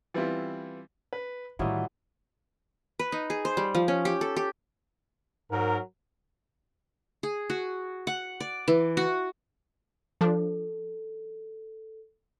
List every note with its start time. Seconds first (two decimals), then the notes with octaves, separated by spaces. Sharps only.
0.14 E3 G3 B3 C4 E4 F4
1.13 B4
1.59 A2 D#3 E3 F#3 G3 E4 F4 D#5
2.99 B4
3.12 D#4
3.30 G#4
3.45 C5
3.57 G3
3.75 F3
3.88 C#4
4.05 G4
4.21 A4
4.36 G4
5.51 G#2 F#3 A#4
7.23 G#4
7.50 F#4
8.07 F#5
8.40 D5
8.68 E3
8.97 F#4
10.21 F3 D4 A4